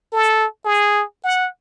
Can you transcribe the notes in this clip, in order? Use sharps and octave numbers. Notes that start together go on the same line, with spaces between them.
A4
G#4
F#5